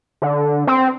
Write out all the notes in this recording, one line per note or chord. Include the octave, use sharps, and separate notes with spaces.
D3
C4